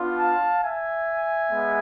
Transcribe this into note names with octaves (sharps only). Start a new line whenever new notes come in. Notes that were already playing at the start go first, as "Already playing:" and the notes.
Already playing: B3 D4 F4
F5 A5
E5 G#5
G#3 B3